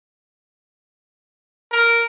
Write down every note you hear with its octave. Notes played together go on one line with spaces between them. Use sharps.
A#4